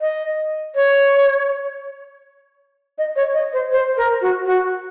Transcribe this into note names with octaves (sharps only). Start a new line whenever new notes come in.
D#5
C#5
D#5
C#5
D#5
C5
C5
A#4
F#4
F#4